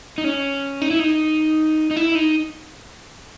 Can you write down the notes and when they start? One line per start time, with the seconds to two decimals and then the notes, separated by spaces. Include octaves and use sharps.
0.18 D#4
0.24 C#4
0.82 D#4
0.91 E4
0.99 D#4
1.91 D#4
1.96 E4
2.15 D#4